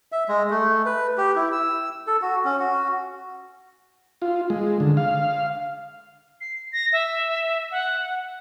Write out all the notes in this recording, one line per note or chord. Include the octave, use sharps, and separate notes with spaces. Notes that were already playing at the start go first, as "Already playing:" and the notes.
E5
G#3
A3
B4
G4
E4
E6
A4
F#4
C#4
F#4
F4
G#3
D3
F5
C7
A#6
E5
F#5